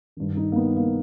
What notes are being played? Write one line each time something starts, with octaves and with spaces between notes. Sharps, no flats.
G2 D#3
D#4
A#3
B3
A#3